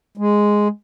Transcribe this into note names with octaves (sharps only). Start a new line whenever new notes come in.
G#3